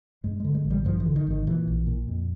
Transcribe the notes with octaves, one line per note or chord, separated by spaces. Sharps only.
G2 G#3
D3 G#3
G#3
A1
G3
G2 F3
E3
D3
D#3
G#1 D#3
A#2 E3
A#1
A#2
F2